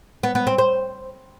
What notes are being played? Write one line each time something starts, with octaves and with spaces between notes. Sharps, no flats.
B3
B3
C4
C5